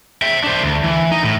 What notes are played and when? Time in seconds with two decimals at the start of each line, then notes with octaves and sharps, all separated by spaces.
0.22 E5 G5
0.44 D4 C5
0.62 D2
0.83 E3
1.12 D#4
1.24 A2